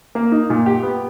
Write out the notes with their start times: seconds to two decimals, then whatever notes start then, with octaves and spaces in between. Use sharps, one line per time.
0.15 A#3
0.32 D#4
0.50 A#2
0.66 G4
0.83 B3